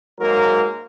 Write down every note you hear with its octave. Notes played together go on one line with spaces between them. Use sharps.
G#2 F#3 A#3 A#4